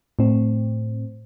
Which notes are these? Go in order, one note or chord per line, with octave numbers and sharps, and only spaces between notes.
A2 C4